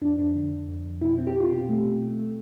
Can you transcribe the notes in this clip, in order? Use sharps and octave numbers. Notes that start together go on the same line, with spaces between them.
F2 D4
F2 D4
D3
F2
F2
F2
B2 E4
C4
G4
C4
F4
B2 G4
A3
B2
A3
A3